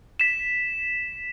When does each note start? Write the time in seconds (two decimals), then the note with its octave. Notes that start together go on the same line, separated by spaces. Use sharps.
0.20 B6 E7